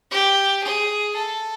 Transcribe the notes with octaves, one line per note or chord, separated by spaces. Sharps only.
G4
G#4
A4